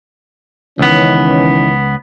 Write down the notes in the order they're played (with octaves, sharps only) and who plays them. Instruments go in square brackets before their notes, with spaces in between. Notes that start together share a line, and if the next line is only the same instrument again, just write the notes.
[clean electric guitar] C#2 B3 [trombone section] D#3 E3 C#4